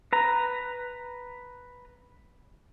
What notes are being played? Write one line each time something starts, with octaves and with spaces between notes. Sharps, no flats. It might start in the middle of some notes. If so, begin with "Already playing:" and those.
B4 A#5